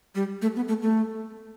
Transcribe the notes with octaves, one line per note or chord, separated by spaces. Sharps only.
G3
A3
B3
A3
A3